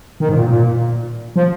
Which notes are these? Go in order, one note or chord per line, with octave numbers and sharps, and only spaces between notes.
D#3
G#2
A#2
A#2
F3